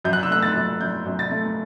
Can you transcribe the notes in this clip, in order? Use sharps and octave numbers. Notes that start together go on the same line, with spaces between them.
F#2 G6
F#6
E6
A3 F#6
A6
F#2
F#2 G6
F#2
A6
A3